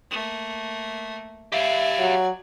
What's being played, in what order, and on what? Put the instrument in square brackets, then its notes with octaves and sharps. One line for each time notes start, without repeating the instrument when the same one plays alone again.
[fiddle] A3 A#3
[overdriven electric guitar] G4 F5 [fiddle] D5 G#5 [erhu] E5
[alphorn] F#3